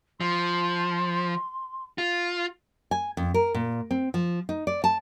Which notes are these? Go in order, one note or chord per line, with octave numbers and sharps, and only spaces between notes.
F3 C6
F4
G#5
F2
A#4
A#2
C4
F3
D#4
D5
A5